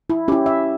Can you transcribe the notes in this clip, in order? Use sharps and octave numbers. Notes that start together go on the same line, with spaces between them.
E4
C#4 E4 G4
E5